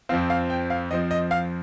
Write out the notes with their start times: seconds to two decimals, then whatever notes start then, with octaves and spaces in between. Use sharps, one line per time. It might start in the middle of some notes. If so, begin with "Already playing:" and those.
0.09 F2 F3 C4 F5
0.30 F5
0.50 G5
0.70 F5
0.91 F2 F3 C4 D#5
1.11 D#5
1.31 F5